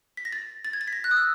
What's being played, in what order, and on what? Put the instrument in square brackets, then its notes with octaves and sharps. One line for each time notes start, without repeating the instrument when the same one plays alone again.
[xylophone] B6
A#6
A6
A6
G#6
A6
B6
A#6
F#6
D#6
E6